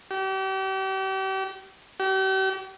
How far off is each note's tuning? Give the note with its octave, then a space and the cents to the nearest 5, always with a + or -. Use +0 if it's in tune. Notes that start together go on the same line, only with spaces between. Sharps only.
G4 -40
G4 -45